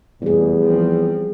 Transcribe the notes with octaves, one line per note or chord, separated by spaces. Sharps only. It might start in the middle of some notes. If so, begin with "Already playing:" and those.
F1 E2 G3 G#4
F3 C4